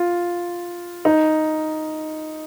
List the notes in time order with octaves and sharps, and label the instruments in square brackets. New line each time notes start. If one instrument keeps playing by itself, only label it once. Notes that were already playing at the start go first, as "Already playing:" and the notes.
Already playing: [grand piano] F4
D#4